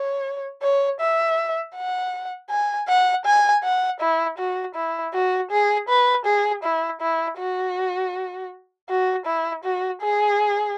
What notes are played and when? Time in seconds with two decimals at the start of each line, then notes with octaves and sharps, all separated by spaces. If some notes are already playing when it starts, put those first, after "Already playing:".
Already playing: C#5
0.62 C#5
1.00 E5
1.75 F#5
2.50 G#5
2.88 F#5
3.25 G#5
3.64 F#5
4.00 E4
4.38 F#4
4.75 E4
5.14 F#4
5.51 G#4
5.89 B4
6.26 G#4
6.63 E4
7.01 E4
7.39 F#4
8.89 F#4
9.26 E4
9.64 F#4
10.02 G#4